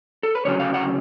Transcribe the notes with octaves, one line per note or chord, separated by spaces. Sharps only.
A4
B4
D2 C#3 F#3 C#4 C#5
F5
F#5